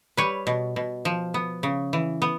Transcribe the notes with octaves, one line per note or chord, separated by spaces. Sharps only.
G3 B4 C#5
B2
B2
F3
B3
C#3
E3
B3